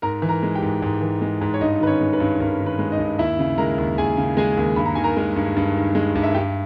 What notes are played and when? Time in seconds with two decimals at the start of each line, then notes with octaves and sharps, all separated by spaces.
0.02 G#2 A#4 A#5
0.22 E3
0.29 A#4 A#5
0.43 G#3
0.55 G4 G5
0.62 G#2
0.82 G#2
1.01 E3
1.21 G#3
1.41 G#2
1.54 C#5
1.61 G2 D#4 D#5
1.80 D#3 B4
1.87 C#4 C#5
2.01 G#3
2.13 B4
2.20 G2
2.40 G2 A#4
2.60 D#3
2.66 B4
2.79 G#3
2.92 D#4 D#5
2.99 G2
3.19 D#2 E4 E5
3.39 C#3
3.58 G#3 A#4 A#5
3.78 D#2
3.98 D#2 G#4 G#5
4.17 C#3
4.37 G#3 G#4 G#5
4.57 D#2
4.76 G2 B5
4.85 A#5
4.95 D#3 G#5
5.04 A#4 A#5
5.17 G#3
5.36 G2
5.57 G2
5.76 D#3
5.95 G#3
6.15 G2
6.23 E5
6.34 G2 G4 G5